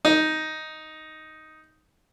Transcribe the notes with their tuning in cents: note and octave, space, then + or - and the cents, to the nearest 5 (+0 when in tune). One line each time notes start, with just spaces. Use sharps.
D#4 +5